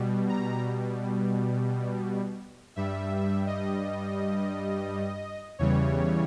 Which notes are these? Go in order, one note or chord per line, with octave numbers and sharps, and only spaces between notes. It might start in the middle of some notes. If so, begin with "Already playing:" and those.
Already playing: B2 G3
A#5
G2 G3 E5
D#5
E2 C#3 E3 G3 C#5